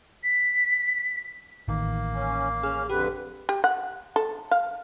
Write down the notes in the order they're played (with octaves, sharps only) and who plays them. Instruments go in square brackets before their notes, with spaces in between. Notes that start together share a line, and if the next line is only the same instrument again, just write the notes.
[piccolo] B6
[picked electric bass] A1 D#3 [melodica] A#3
[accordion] C#4
[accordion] C#4 F6 [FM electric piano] G#4
[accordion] F2 D3 B4 [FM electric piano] G4
[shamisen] G4
F#5
A4
F5